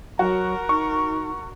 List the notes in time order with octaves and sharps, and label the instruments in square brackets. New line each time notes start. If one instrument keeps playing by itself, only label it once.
[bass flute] F#3 [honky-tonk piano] F#4 [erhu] A#4
[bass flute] D#4 [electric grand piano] C#6